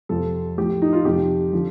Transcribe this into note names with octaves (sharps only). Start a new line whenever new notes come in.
F2 C3 F3 A4
A2 F3 G4
D#4
F4
F2 C3 F3 G4
D3 F3